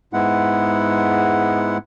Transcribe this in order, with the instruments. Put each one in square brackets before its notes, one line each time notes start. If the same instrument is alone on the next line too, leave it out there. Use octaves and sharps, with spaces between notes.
[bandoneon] G#2 G#3 B3 E4 F#5